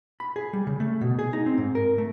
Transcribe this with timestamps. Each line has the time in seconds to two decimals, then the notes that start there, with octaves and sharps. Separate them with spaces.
0.20 B5
0.36 G#4
0.53 G3
0.67 C#3
0.80 A3
1.01 B2
1.19 G#4
1.33 D#4
1.46 C4
1.58 G#2
1.75 A#4
1.98 A3